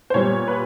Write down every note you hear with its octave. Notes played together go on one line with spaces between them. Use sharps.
C5
A#2 G3 B3 C#5
B4